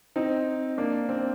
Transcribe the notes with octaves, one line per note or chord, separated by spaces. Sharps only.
C4 D#4
A#3 D4
C4